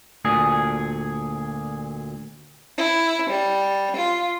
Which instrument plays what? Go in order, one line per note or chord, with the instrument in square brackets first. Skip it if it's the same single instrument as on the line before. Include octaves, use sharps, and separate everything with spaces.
[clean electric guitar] D2 A#2 G#4
[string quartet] E4
G3
F4